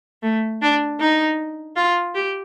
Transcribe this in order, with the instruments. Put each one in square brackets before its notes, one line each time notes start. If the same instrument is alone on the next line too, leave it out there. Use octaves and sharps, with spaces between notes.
[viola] A3
D4
D#4
F4
G4